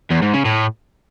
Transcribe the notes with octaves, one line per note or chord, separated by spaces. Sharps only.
E2
G#2
C#3
A2